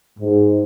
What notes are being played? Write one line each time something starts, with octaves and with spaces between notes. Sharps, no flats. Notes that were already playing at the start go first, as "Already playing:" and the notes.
G#2